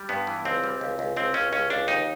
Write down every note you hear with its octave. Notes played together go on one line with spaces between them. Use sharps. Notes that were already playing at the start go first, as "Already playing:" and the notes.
Already playing: G3
G2 B3
E3
C#2 C4
G3
C#2
C#2
C#2 C4
C#2 C#4
C#2 C#4
C#2 D4
D#2 D#4